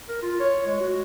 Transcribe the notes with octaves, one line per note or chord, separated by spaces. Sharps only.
A#4
F4
C#5
G#3
F#4